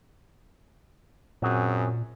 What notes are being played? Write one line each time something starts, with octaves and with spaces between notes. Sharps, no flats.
F#2 A#2 C4 F#4 G#4